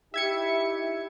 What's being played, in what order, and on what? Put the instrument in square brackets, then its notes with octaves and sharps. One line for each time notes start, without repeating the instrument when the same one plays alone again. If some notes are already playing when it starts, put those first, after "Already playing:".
[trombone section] D#4 E4 G4 [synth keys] E5 G#6 C#7